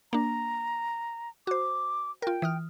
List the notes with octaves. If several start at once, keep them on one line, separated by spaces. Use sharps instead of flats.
A#3 D4 A#5
F#4 C5 D6
F4 A#4 G5
E3 D#6 F6